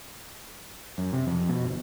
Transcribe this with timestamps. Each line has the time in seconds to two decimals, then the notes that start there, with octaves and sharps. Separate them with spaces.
0.98 F#2
1.13 C3
1.27 F2
1.49 B2
1.65 G1